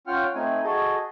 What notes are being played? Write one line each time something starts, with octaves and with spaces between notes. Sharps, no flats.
C#4 F4 F#5 G5 F6
A3 C4 D#4 G#5
F#4 G#4 A4 D#5